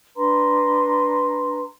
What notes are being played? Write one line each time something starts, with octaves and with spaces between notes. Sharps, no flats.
D4 B4 A#5 C6